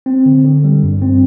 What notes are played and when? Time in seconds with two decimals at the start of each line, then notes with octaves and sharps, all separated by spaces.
0.06 C4
0.26 D3
0.44 D3
0.64 G3
0.83 G2
1.02 C4